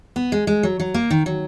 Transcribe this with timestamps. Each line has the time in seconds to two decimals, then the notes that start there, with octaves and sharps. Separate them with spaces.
0.16 B3
0.32 G#3
0.47 G#3
0.63 F#3
0.80 F#3
0.94 A#3
1.10 D#3
1.26 F#3